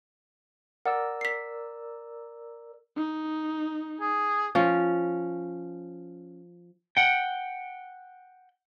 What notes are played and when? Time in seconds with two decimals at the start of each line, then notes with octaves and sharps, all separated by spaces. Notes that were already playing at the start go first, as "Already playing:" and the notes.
0.86 A#4 D5 F#5 E6
1.21 B6 C7
2.96 D#4
4.01 G#4
4.55 F3 C#4
6.97 F#5 G5